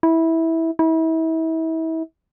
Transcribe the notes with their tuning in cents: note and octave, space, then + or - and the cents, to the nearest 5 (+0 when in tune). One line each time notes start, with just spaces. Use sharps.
E4 -15
E4 -35